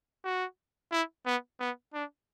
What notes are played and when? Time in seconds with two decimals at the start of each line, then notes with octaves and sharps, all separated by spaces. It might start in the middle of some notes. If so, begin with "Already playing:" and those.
0.24 F#4
0.92 E4
1.26 B3
1.60 B3
1.94 D4